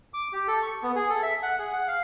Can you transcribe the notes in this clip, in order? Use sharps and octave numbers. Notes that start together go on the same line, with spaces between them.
D6
G4
A4
C#6
B3
G#4
A4
E5
F#5
G#4
F#5
F5